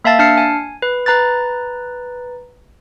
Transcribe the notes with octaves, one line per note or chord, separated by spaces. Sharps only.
A#3 E5 F5 A5 A6
D4 A5 F6 C7 C#7
G#5
B4
B4 A#5 F#6 A6